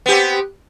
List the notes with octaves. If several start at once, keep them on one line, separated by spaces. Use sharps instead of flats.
B3 C4 G4